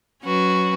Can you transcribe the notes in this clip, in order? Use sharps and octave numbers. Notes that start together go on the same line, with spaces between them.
F#3 C#4 F#4 B4